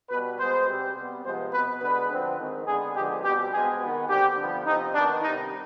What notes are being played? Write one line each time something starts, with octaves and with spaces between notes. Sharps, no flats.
B2 G3 B3 B4
B2 G#3 B3 C5
C3 G3 C4
C3 G3 B3
C3 F3 G#3 B3 C5
B2 B3 B4
D3 G#3 B3 B4
D3 F3 C4
D#3 G#3 C4
D3 G#3 B3 G#4
D3 F3 G#3 B3 G4
B2 G3 C4 G4
B2 G#3 C4 G#4
B3
D#3
D3 G3 C4 G4
D3 F3 B3
C3 F3 C4 D#4
D#3 B3 D4
C3 D#3 G3 D#4